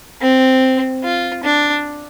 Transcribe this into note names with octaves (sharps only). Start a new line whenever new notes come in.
C4
F4
D4